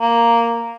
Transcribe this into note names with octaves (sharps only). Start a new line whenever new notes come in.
A#3